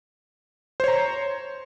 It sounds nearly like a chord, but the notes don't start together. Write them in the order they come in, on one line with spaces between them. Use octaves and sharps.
C5 C#5 A#5